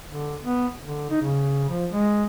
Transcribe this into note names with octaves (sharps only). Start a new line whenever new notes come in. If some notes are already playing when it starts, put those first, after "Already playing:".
D3
B3
D3
D#4
C#3
F3
G#3